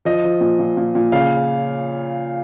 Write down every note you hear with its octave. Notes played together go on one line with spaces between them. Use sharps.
F3 D#5
F3
A#2
A#2
A#2
A#2
C#3 F5